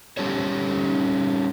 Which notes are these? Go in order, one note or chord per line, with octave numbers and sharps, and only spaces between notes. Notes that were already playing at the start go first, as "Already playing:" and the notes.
G3 C#4 G4 A4 C5 C#5